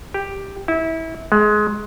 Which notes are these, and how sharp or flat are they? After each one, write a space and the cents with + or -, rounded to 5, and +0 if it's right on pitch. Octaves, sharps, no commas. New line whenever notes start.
G4 +5
E4 -25
G#3 +20